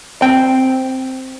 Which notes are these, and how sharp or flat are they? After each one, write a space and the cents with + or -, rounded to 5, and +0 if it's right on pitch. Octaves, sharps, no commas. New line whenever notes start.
C4 +0 G5 +0